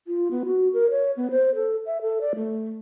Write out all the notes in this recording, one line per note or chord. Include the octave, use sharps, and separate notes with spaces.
F4
B3
F#4
A#4
C#5
B3
C5
A4
E5
A4
D5
A3